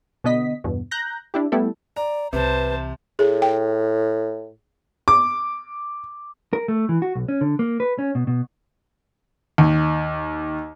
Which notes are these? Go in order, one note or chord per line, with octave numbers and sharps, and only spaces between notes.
B2 D3 B3 D#5 B6
E2 G2 B2
A#5 F#6 G6 A#6
D4 E4 G4
G3 A3 B3 E4 G4 A4
D5 A#5
C2 C3 E3 B4 C5 A5
A2 G#4
G5
D6
A#4
A3
E3
F#4
B1
C#4
D3
A#3
B4
C#4
B2
B2
D#2